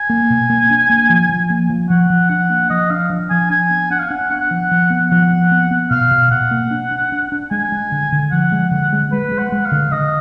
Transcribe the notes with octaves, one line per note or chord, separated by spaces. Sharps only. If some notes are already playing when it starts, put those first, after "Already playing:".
Already playing: G#5
A#3
B2
A#3
D4
A#3
F3
F3
A#3
F3
F3 F#5
F3
D4 F#5
A#3
F3 D#5
D4 F5
F3
F3 G#5
D4 G#5
B3
D4 F#5
F5
D4 F#5
B3 F#5
F3
F3
B3
F3 F#5
B3
B3
B3
B2 F5
B2
B2 F#5
A#3
D4
D4
D4
D4
G#3 G#5
G#3
D3
D3
F3 F#5
G#3
D3
G#3
G#3 B4
G#3
F#5
G#3
F5
D3
D3 D#5